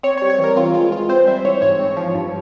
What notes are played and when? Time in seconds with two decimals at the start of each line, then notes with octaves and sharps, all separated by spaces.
0.03 C4 C#5
0.18 C#5
0.22 G3
0.30 C#5
0.38 E3
0.44 A#4
0.56 C4 F4
0.74 G#3 F4
0.92 E3 F4
1.09 C4 C5
1.27 G3 E5
1.45 E3 C#5
1.62 G#2 C#5
1.79 C4
1.97 F3
2.15 G2